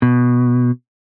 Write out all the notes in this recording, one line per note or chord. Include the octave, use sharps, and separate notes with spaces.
B2